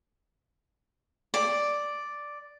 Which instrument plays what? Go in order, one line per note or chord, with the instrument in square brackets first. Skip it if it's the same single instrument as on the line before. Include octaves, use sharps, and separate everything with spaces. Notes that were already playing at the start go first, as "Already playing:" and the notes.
[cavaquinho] D5